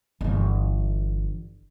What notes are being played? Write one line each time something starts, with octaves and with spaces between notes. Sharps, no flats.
G1 E3